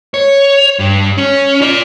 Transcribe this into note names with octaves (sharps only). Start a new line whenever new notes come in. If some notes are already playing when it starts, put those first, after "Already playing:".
C#5
G2
C#4
F4 D5